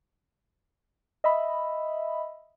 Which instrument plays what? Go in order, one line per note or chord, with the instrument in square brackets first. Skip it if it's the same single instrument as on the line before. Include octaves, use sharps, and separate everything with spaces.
[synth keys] D#5 E5 B5